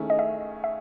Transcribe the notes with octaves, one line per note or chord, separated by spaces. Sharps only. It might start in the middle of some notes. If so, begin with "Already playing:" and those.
Already playing: D#3 A3 C#4 E4 G#4
D#5
E5
E5